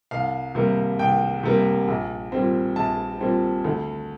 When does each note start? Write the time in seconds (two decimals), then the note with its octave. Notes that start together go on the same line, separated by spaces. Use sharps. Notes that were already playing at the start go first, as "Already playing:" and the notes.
0.11 C2 F5
0.55 C3 G3 A#3
0.99 C2 G5
1.43 C3 G3 A#3
1.88 A#1
2.32 A#2 G3 C4
2.76 A#1 A5
3.21 A#2 G3 C4
3.64 D2